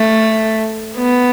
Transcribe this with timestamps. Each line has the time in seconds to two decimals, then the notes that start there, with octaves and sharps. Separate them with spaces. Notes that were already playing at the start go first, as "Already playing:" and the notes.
Already playing: A3
0.98 B3